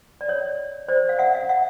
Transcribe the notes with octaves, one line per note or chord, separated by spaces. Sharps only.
D5
C#5 D#5
C5 D5
F5
E5 F#5
D#5 F5
E5 F#5